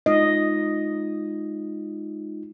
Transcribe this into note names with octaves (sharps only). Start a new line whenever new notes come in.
G#3 D#4 F4 D#5